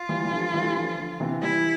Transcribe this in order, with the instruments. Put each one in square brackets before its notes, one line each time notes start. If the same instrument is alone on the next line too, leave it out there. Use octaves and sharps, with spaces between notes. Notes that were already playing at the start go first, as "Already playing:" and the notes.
Already playing: [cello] F4
[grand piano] E3 G3
G3
D3 F3
E3 G3
A3
G3
D3 F3
D3 F3
C3 E3
[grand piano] E3 G3 [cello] E4